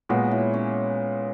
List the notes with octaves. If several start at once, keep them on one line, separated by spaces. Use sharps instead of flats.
A#2 F#3 G#3 B3 F#4
E4
C#4